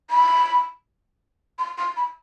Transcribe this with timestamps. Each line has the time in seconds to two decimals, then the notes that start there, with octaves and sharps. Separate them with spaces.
0.10 B5
1.59 C6
1.78 C6
1.96 B5